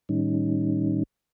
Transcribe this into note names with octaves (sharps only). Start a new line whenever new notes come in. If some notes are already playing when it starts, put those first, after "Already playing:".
A2 D#3 G3 C#4 D#4